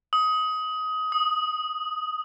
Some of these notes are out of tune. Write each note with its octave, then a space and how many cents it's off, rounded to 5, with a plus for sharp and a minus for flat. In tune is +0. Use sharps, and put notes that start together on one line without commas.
D#6 +20
D#6 -5